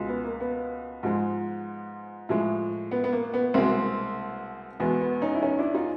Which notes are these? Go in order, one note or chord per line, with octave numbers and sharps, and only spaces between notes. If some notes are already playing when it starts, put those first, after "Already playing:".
Already playing: C#2 B2 G#3
B3
A#3
B3
G#2 F3 G#3
A2 F3 G#3
B3
B3
A#3
B3
C2 B2 G#3 A#3 C4
E2 B2 G#3 B3
B3
C#4 D#4
E4
C#4 D#4
D4 E4
D#4 F4